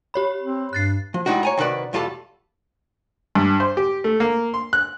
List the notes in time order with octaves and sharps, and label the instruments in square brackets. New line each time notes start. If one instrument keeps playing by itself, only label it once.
[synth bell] G4 C#5 B5
[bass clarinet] C4
[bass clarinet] G2 [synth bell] F#6 A6 C7
[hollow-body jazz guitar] F3
G3 G#3 D#4 E4 F#4
C#5 G#5 A#5
C3 D#3 F#4 B4 D5
B1 E2 G3 F4 A4 A5
[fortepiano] G2
C5
G4
A3
A#3
C6
F#6